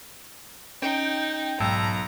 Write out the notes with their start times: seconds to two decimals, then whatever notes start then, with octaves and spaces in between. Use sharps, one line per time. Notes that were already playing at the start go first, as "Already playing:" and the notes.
0.82 C#4 D#4 G5
1.60 B1 G#2 A5 A#5 E6